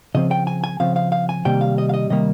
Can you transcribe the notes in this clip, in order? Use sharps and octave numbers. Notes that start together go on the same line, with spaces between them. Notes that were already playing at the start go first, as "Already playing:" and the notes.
C#3 F3 C4 D#5
G5
G#5
G#5
C#3 F3 C4 F5
F5
F5
G#5
C3 D#3 G3 A#3 G5
F5
D#5
F5
D#5
C3 D#3 G3 A#3 D#5